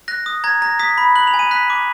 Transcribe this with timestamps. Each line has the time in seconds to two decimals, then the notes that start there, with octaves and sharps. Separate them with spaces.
0.08 F#6 A#6
0.26 D#6
0.44 A#5 G#6
0.62 A#5 A#6
0.79 D#6 B6
0.98 B5
1.15 F#6 F#7
1.27 F7
1.34 G#5
1.39 D#7
1.51 F#6 B6
1.70 D6